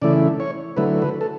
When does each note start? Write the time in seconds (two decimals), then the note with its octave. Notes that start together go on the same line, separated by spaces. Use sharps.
0.02 C#3 E3 A3 E4 D5
0.40 C#5
0.77 D3 F#3 A3 E4 B4
1.02 B4
1.21 A4